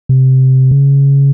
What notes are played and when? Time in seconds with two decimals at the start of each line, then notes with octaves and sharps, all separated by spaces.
0.09 C3
0.71 C#3